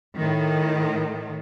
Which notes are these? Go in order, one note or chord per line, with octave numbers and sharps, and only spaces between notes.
A2 D#3